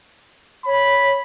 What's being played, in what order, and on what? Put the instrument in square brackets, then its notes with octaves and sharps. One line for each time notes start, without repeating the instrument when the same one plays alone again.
[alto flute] C#5 [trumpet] B5